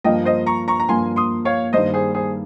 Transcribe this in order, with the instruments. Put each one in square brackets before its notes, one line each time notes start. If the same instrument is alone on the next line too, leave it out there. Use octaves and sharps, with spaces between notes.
[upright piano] G2 F3 A#3 [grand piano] D#5 G5
[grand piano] C5 D#5
A#5 C#6
A#5 C#6
A#5
[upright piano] G2 F3 A#3 [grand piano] G#5 C6
[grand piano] C6 D#6
C#5 F5
[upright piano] G2 D#3 G3 A#3 [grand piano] C5 D#5
[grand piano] G#4 C5
G#4 C5